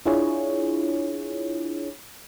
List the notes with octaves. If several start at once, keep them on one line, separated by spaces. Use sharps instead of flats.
D4 E4 F4 G#4 C#5